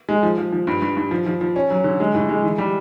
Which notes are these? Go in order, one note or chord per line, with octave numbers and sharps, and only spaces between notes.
G#3
F3
F3
F3
G2
G2
G2
F3
F3
F3
C#4
F#3
D3
G#3
A2
G#3
E3
G3